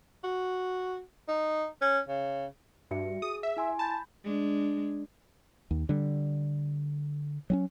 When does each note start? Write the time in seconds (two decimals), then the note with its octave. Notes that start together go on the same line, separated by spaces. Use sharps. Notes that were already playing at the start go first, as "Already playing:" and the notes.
0.24 F#4
1.28 D#4
1.81 C#4
2.09 C#3
2.91 G2 F#4 E5 C#7
3.22 G#4 D#6
3.43 E5
3.57 E4 G#5 C6
3.79 A5 B5 G6
4.24 G#3 D4
5.71 D#2
5.89 D3 G3
7.50 F#3 C4 C#4